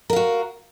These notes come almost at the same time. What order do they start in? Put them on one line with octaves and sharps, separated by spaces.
A#4 F5 F#4